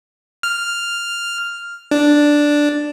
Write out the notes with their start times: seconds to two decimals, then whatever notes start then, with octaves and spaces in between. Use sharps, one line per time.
0.43 F6
1.91 D4